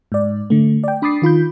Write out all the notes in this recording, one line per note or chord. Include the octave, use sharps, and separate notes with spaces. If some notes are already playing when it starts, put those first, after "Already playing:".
G#2 D5
D3 A3
D5 G5
D4 B5 D6 D#6 A6 C7
D#3 F4 B5 G6